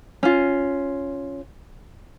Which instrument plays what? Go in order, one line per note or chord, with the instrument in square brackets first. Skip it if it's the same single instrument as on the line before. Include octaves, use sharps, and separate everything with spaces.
[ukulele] C#4 F4